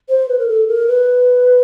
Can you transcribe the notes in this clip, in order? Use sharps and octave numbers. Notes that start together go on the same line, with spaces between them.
C5
B4
A#4
A4
A#4
B4